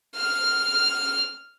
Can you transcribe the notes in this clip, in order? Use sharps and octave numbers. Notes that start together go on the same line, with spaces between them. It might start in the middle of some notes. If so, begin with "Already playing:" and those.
F6